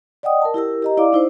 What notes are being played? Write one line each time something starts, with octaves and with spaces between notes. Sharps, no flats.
D5 D#5 F#5 G5 D#6
A#4 A5
E4 G4 A#4 E6
G4 D#5 A#5
E4 D5 F5 D6
D#4 E4 C5